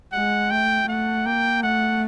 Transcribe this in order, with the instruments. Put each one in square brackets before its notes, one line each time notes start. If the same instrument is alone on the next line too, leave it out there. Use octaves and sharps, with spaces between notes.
[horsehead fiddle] G#3 [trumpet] F#5
[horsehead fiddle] A3 [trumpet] G5
[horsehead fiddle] A3 [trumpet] F#5
[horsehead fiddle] A#3 [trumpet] G5
[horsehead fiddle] A3 [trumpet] F#5